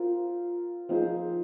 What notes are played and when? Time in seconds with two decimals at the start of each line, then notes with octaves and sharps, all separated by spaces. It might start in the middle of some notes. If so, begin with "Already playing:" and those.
Already playing: C4 F4 A#4
0.89 F3 C4 D#4 G#4